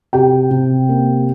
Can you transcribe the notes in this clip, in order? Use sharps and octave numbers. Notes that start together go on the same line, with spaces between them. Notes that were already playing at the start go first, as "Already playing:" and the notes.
C3 G4 G5
C3
A#3